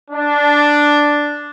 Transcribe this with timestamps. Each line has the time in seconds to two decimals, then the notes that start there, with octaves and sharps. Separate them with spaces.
0.11 D4